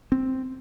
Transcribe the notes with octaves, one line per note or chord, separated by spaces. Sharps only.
C4